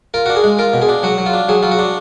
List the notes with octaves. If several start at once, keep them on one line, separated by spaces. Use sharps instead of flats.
F4 A#4
D4 F#4
G#4
G#3
F4 A#4
B2
G#4
D4
F#3 F#4
F#3
F4
D4
F#3 G#4
F#3 F4
F#4
D4